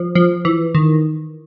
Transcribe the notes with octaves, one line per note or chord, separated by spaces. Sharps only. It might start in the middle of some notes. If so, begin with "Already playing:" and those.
Already playing: F3
F3
E3
D#3